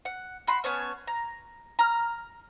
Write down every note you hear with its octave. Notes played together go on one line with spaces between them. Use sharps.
F#5
F#4 B5 C6
B3 C#4 C#5 A5
A#5
A#5 F6